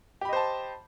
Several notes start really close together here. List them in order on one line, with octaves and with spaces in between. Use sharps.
G4 B5 D#5 C5 A5